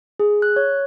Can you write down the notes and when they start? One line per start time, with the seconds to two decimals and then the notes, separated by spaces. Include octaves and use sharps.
0.20 G#4
0.42 F#6
0.56 C#5